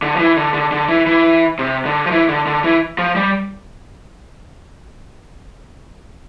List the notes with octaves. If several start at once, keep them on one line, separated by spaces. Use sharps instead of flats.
D3
F3
E3
D3
D3
D3
E3
E3
C3
D3
F3
E3
D3
D3
E3
F3
G3